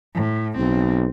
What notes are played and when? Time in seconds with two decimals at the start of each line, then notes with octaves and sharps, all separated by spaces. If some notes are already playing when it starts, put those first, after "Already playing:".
0.15 A2
0.57 B1 C4